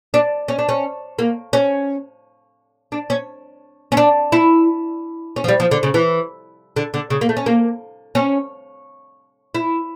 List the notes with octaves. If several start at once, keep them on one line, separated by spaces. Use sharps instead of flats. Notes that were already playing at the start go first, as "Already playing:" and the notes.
D4
C#4
D4
C#4
A#3
C#4
D4
C#4
C#4
D4
E4
C#4
F3
G3
F3
D3
C#3
E3
D3
D3
C#3
A#3
A3
C#4
A#3
C#4
E4